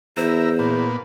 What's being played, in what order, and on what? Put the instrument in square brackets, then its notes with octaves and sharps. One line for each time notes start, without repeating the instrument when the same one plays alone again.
[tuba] E2 [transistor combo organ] E4 A#4 [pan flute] C5
[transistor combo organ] A#2 B3